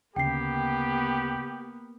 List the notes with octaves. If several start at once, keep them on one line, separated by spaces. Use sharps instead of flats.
D2 C#3 A#3 B3 G4 G5 C7